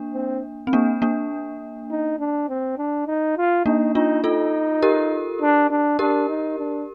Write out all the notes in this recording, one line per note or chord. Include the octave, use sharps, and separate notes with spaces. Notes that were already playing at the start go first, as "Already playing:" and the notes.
Already playing: A#3 D4
C4
C4
A#3 D4
A#3 D4
D#4
D4
C4
D4
D#4
F4
A#3 D4 D#4
D4 D#4 F4
D#4 F4 A4
G4 A#4
D4
D4
D4 G4 A#4
D#4
D4